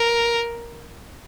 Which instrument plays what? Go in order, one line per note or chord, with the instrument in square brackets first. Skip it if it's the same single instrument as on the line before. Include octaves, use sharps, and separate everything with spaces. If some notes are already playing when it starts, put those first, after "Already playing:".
Already playing: [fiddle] A#4